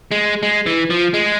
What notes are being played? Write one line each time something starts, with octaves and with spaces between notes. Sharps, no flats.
G#3
G#3
E3
F3
G#3